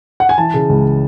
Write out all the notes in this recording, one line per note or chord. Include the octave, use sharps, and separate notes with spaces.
F#5
G#5
E3 A5
C#3
C#2